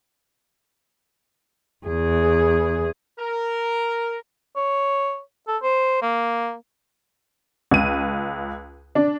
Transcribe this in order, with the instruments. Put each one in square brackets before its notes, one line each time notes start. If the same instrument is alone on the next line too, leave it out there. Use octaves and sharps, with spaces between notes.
[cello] E2 G#4
[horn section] A#4
[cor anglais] C#5
A4
C5
A#3
[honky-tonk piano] C#2 D#7
D4